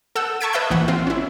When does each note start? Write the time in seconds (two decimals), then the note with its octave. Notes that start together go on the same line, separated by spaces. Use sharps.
0.15 A4 F#5 E6 G6
0.41 A5 C#6 E6 G#6 B6 D7
0.53 B4 D#5 E5 E6 F#6 G6
0.70 A#1 E3 F#5
0.88 C4 F4
1.07 C#4 E4